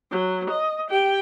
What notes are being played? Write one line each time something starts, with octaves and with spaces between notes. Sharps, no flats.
F#3
D#5
G4 G5